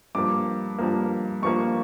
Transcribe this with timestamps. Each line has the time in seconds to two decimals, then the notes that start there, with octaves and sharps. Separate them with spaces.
0.15 G2 F3 A#3 D6
0.78 G2 F3 A#3
1.43 G2 F3 A#3 C#6